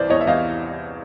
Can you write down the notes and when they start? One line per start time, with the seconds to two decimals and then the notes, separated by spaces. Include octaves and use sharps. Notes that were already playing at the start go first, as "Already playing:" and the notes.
Already playing: C2 E3 C5 D5
0.09 E2 C#5 D#5
0.21 E5
0.27 E2 D#5 F5